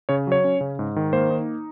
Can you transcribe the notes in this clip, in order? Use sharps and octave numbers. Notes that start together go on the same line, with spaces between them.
C#3 C#5
F#3 C#5
C#4
C#3
G#2
D#3
A#3 C5
D#4